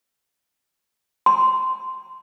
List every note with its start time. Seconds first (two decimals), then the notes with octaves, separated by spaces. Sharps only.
1.26 C6